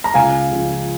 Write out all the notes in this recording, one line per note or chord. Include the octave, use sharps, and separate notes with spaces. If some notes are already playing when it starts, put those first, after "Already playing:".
A#5
C#2 F5 G#5
C#3 F3